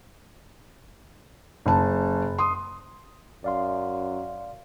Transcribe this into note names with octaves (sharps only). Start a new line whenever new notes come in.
F#1 A5
C6 D#6
F#2 D5 F5 C6